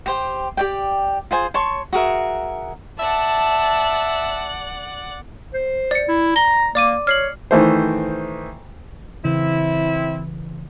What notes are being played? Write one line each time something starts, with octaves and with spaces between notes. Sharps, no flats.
G4 C5 G5
G4 D5 G5
F4 G#4 C5 G#5
C#5 A5 C6 C#6
F#4 G#4 A#4 E5
D5 E5 F#5 A5
C5
D5 C#7
E4
A#5 G7
A#3 D5 D6 D#7
C#5 F6 C7 F#7
D#3 E3 A3 C5
C#3 E3 C4 E4